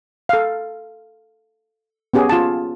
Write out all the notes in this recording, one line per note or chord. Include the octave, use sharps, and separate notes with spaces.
A4 F5
B3 C#4 G4 G#4
F4 A5